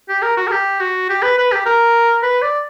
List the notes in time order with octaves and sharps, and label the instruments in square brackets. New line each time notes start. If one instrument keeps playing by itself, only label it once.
[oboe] G4
A#4
F#4
A#4
G4
F#4
G4
B4
B4
G4
A#4
B4
D5